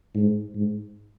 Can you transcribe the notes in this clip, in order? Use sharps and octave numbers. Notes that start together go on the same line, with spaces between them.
G#2
G#2